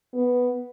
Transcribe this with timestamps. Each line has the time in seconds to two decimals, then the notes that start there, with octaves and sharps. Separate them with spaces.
0.14 B3